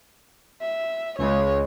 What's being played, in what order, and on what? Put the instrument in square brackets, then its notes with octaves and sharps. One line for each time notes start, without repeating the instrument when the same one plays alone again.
[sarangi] E5
[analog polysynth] C#2 C#3 G#3 [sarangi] C#5